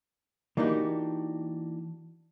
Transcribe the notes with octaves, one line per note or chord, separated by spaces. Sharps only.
E3 A#3 D4 D#4 F#4 G4